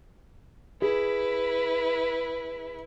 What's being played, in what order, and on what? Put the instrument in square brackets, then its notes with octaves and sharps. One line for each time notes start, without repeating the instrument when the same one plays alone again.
[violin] E4 B4 [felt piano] G#4